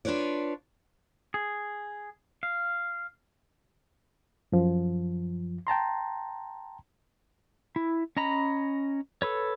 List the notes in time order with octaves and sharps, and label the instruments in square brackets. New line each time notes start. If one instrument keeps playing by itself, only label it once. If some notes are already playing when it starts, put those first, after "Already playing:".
[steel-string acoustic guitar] D4 F4 B4 C#5 D5
[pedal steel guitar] G#4
F5
[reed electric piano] F#2 F3
G5 A5 A#5 C6
[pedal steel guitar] E4
C#4 D#5 A#5 B5
A4 B4 C#5